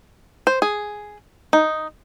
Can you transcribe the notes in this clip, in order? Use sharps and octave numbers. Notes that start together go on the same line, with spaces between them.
C5
G#4
D#4